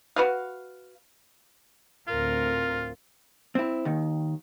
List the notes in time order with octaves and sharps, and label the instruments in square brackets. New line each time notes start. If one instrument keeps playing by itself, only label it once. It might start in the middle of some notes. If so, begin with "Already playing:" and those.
[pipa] F#4 B4 F5
[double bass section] D2 A2 C4 [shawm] F4 [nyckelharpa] A#4
[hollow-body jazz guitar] C4 E4
D#2 D#3